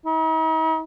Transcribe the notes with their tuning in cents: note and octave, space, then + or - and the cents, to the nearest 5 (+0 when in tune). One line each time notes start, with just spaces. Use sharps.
D#4 +45